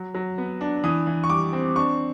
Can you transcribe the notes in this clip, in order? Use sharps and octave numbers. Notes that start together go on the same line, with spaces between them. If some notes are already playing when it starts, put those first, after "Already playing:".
Already playing: F#3
F#3
B3
D4
E3 D#6
E3
C#6
G3 D6
C4
D4 C#6